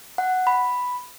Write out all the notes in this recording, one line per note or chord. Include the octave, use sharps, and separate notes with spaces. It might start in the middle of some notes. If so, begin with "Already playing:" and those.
F#5
B5